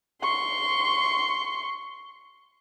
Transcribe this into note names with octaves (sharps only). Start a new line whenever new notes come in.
C6 C#6